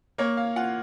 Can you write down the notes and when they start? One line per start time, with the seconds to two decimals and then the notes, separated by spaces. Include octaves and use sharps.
0.18 A#3 C#5
0.37 F5
0.56 F4 F#5